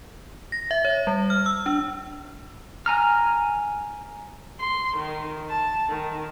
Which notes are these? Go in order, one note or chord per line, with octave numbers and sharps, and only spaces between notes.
A#6
E5
C#5
G3
F6
E6
D4
G#5 A#5 F6
C6
D#3
A5
D#3